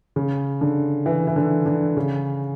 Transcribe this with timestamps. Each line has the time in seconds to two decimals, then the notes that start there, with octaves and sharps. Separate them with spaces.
0.16 C#3
0.61 D3
1.06 E3
1.27 E3
1.36 D3
1.66 D3
1.97 C#3